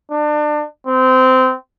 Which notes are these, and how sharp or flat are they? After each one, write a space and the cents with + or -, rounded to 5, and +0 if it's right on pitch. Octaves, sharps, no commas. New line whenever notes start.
D4 +30
C4 -20